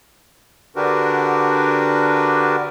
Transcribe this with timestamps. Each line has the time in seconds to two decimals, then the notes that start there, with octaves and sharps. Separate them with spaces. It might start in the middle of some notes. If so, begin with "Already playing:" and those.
0.76 D3 D4 F#4 G4 A#4 B4